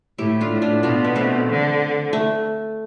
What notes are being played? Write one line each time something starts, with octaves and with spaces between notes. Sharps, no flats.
A2 E4 G4
D4 F4
A2
D4 F4
B2 D4 F4
B3
A3 C4
D3
A3